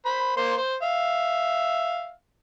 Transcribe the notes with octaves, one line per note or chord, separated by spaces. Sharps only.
C5 B5
A#3 C5 C6
C5
E5 F5